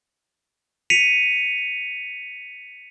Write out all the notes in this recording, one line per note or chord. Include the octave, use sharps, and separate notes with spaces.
B6 C#7 D#7 F7